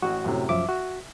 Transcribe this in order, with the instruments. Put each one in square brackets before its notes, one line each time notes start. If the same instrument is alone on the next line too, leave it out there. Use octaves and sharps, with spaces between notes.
[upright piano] A1 [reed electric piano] F#4
[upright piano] F#2 A2 C3
[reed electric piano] F#2 F3 D6 [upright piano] E5
[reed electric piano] F#4